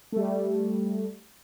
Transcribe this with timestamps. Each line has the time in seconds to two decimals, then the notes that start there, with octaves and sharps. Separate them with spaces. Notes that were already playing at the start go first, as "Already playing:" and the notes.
0.12 G3 A3